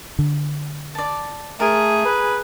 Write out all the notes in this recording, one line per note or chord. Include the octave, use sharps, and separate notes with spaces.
D3
D5 A5
A3 G#4 A#4 A5
B4